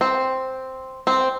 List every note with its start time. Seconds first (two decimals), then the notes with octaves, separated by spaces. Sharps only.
0.01 C4
1.07 C4